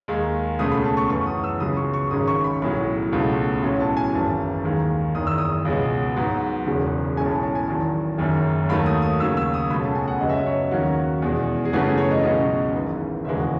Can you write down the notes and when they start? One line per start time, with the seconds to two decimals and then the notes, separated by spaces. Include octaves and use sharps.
0.08 D#2 D#3 G#3
0.59 C#2 B2 A3 C#4 D#6
0.72 B5
0.84 A5
0.97 C#6
1.09 F#2 E3 B3 C#6
1.27 D#6
1.44 E6
1.60 C#2 C#3 F#3 B3 D#6
1.77 C#6
1.94 C#6
2.11 G#1 G#2 D#3 G#3 C#4 D#6
2.28 C#6
2.44 B5
2.62 B1 A2 F#3 B5
3.12 C#2 B2 A3 C#4
3.63 B1 A2 F#3 C#4
3.80 A5
3.97 G#5
4.13 G#1 F#2 E3 A5
4.64 D#2 D#3 G#3
5.15 F#1 E2 D#3 D#6
5.27 E6
5.38 D#6
5.65 C#2 B2 G#3 B3
6.16 G#2 F#3 B3
6.66 E1 E2 C#3 F#3
7.17 B1 A2 G#3 C#4 G#5
7.25 A5
7.30 B5
7.43 A5
7.55 G#5
7.68 E2 D#3 F#3 A5
8.18 F#1 F#2 D#3
8.69 D#2 D#3 F#3 A3 B5
8.86 D#6
9.02 D#6
9.20 D#2 C#3 F#3 E6
9.37 E6
9.54 D#6
9.70 C#2 B2 A3 C#4 B5
9.83 A5
9.95 G#5
10.08 F#5
10.21 F#2 C#3 F#3 B3 D#5
10.29 E5
10.36 D#5
10.46 C#5
10.71 D#2 D#3 F#3 C#4 F#4
11.22 E2 B2 G#3
11.65 G#4
11.73 F#2 C#3 E3 A3 C#4 F#4
11.85 G#4
11.98 C#5
12.11 D#5
12.23 C#2 B2 F#3 C#4 D#5
12.74 G#1 G#2 E3
13.25 E1 D#2 C#3 E3 G#3 E5
13.37 F#4